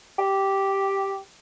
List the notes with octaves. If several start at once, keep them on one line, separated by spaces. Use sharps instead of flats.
G4